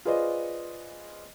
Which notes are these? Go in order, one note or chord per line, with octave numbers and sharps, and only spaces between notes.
F4 G#4 B4 C5 D5 D#5